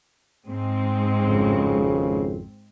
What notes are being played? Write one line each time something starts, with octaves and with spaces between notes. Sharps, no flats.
G#2 G#3 C4
G#1 F2 C#3